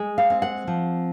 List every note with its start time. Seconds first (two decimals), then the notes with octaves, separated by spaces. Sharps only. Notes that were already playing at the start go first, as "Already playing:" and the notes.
Already playing: G#3
0.18 F5
0.30 C4
0.42 F#5
0.67 F3